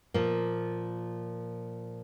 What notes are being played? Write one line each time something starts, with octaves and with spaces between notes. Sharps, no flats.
A#2 F3 A#3